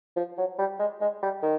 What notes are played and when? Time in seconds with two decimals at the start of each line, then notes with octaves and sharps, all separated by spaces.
0.16 F3
0.38 F#3
0.59 G3
0.79 G#3
1.01 G#3
1.23 G3
1.43 D#3